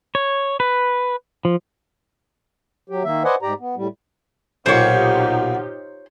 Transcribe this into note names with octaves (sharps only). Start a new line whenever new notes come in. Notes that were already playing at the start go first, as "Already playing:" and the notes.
C#5
B4
F3
F#3 G4
D#3 A#3 E5
B4 C5 D5 D#5 F#5 G#5
G#2 G4 D5 A#5
B3
A2 G3
B1 A#2 D#4 F4 G4 C5 C#5 F#5